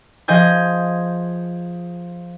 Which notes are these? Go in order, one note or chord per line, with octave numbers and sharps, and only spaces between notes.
F3 G#4 D#5 G#5 G6